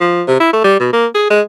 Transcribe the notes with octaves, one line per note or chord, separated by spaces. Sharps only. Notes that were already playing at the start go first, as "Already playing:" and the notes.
F3
C3
E4
A3
G3
B2
A#3
G#4
G#3